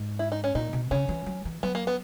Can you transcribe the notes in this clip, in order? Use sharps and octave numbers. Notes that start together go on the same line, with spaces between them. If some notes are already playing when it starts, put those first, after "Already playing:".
Already playing: G#2
E4
D#4
C#4
A#2 D#4
B2
C#3 C#4
E3
F#3
E3
F#3 B3
A#3
B3